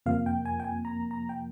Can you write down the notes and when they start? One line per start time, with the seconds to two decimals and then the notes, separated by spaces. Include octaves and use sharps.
0.06 F2 C3 F3 A#3 F5
0.26 G5
0.45 G#5
0.60 G5
0.64 G#5
0.85 A#5
1.11 A#5
1.29 G5